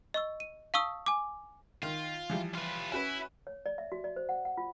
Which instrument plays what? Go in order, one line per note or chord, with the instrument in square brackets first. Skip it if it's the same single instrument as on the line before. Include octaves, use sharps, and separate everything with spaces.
[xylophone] D#5 C#6 E6
D#7
F5 A5 C#6 D#6 E6
G#5 D6
[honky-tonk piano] D#3 [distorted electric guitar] F4
[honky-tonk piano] E3 F3 G3
[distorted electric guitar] F4 B4
[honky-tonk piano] C#4 F#4 B4 [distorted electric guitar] E4
[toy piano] C#5
D5
E5
F#4
D5
C5
F#5
F#5
F4